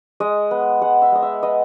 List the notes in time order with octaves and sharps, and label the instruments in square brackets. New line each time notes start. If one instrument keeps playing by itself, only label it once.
[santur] G#3 D#5
B3
G#3 F#5
E5
G#3 D#5
E5
B3 D#5